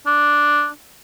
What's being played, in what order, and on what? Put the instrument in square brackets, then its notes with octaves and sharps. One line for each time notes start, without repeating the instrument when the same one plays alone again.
[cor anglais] D4